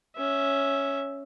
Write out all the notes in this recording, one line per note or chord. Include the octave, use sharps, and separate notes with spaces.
C#4 E5